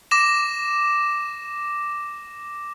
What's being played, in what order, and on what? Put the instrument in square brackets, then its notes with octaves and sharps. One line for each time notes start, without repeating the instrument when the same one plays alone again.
[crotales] D6 A#6 E7